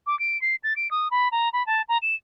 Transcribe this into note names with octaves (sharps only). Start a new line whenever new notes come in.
D6
D7
C7
A6
D7
D#6
B5
A#5
B5
A5
A#5
E7